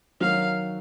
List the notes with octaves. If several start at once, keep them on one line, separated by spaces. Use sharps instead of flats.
D#3 F#3 C4 F5